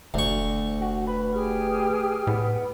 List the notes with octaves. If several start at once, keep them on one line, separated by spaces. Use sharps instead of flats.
F1 D2 C#6
F#4
B4
G4 G#4 F6
A2 B3